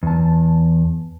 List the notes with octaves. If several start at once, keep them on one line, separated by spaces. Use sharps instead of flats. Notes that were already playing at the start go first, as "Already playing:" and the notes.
E2 A5